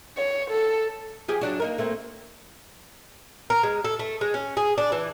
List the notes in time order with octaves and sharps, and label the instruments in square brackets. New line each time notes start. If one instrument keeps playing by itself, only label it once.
[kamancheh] C#5
A4
[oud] F3 G4 G#4
F#3 D4 F#4
A#3 D#4 A#4
A3 A#3 C4
[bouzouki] A#4
G#3
A4
A3
G#3
C#4
G#4
D4
E3